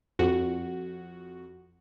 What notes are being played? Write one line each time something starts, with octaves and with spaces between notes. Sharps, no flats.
F2 F#4